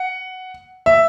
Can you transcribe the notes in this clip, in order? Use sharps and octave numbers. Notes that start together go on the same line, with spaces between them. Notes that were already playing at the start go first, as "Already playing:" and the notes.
Already playing: F#5
E5